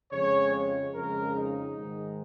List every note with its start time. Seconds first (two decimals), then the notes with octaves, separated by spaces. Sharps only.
0.11 F2 C#3 G#3 C#5
0.53 C#5
0.94 F2 C#3 G#3 A#4
1.36 D#4
1.76 G#2 D#3 G#3